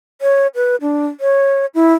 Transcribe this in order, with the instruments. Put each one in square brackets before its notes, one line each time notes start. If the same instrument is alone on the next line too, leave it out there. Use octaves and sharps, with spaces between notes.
[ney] C#5
B4
D4
C#5
E4